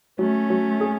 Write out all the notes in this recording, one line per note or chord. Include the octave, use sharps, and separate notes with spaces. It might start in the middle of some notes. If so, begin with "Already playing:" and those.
F#3 A3 C#4
F#3
G#4